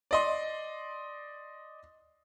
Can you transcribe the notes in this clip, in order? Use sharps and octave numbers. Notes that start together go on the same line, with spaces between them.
D5 D#5 C6